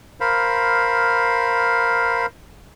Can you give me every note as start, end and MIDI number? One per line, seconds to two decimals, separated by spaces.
0.20 2.26 70
0.20 2.26 72
0.20 2.26 77
0.20 2.26 83